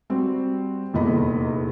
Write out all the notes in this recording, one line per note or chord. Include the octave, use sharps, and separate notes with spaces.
G3 C4 F#4
F1 E2 A#2 D#5 B5